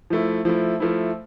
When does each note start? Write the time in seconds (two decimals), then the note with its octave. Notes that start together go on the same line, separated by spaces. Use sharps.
0.10 F3 A3 E4
0.45 F3 A3 E4
0.80 F3 A3 E4